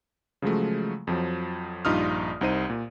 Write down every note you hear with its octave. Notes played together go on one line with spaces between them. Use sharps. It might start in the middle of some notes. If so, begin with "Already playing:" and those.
C#3 F3 F#3 G#3 A3
F2 F3 F#3
A#1 G2 D#4 F4 D#6 F6
C2 D#4 C5 D#7
A#2